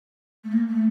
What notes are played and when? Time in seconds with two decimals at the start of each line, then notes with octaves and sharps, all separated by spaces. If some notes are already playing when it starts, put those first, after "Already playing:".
0.44 A3
0.52 A#3
0.68 A3